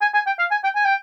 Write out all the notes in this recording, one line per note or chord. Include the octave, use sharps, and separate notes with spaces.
G#5
G#5
G5
F5
G#5
G5
G#5
G5